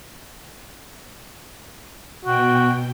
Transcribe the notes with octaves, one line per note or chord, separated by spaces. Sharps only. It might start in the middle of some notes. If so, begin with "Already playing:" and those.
B2 F#4 G5